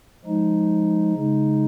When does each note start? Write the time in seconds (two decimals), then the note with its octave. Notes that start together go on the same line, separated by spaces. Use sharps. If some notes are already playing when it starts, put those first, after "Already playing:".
0.25 F3 G#3 D#4
1.15 C#3 G#3 D#4